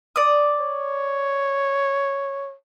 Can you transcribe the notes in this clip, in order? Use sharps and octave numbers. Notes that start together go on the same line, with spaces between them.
D5 D#6
C#5